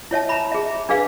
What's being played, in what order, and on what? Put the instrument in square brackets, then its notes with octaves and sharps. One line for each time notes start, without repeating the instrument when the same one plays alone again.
[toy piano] E4 C#5 E5 A5
A#5 B5
G#4 E5
D4 G#4 B4 F5